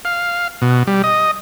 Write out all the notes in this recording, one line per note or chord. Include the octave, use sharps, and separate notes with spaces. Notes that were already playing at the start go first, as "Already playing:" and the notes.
F5
B2
G3
D#5